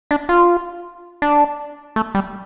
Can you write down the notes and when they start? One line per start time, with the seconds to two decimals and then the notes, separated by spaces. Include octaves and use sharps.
0.11 D4
0.29 F4
1.22 D4
1.96 A3
2.15 G3